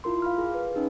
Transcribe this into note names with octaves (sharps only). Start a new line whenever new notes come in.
E4 F4 A#4 C6
F5 B5 F6
G#4
B4
C#4 D#4 G#4